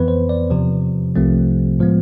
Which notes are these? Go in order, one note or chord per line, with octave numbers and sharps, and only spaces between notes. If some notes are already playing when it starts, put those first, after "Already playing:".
Already playing: F2 E3 B3 B4
C5
D5
E2 C3 F3
C2 C3 F3 A3 C4
A2 F3 G#3 B3